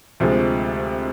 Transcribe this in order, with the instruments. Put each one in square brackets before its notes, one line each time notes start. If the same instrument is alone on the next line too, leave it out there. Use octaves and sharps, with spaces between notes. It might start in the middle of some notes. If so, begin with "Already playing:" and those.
[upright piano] D2 C3 F3 G#3